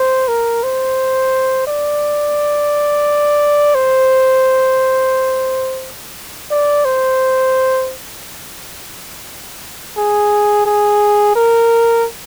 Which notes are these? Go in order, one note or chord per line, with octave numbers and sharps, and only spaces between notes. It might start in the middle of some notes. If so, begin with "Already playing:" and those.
Already playing: C5
A#4
C5
D5
C5
D5
C5
G#4
G#4
A#4